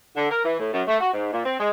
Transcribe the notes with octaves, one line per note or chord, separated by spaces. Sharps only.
D3
A#4
E3
A2
F#2
A3
F#4
G#2
A#2
C4
G#3